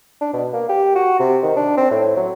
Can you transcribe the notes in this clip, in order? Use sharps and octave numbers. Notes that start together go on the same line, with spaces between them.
D4
B2
A#3
G4
F#4
C3
D#3
D4
C4
A2
F#3